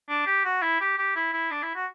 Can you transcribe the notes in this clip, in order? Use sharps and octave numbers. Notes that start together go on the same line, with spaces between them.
D4
G4
F#4
E4
G4
G4
E4
E4
D4
E4
F#4